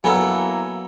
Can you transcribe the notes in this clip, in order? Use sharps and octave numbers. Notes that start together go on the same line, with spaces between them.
F#3 A#3 B3 E4 A4 G#5 A#5 E6